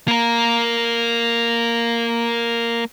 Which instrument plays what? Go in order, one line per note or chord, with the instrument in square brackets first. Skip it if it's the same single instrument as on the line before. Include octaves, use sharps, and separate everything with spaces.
[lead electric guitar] A#3 A#4